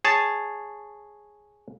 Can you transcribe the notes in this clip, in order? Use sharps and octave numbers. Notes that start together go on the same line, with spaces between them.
G#4 C#5 A5